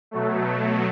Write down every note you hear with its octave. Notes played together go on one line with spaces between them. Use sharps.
B2 F#3 A3